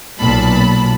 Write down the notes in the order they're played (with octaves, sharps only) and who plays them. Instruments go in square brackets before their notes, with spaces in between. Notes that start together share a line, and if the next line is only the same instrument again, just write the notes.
[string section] B1 A#2 A5 B5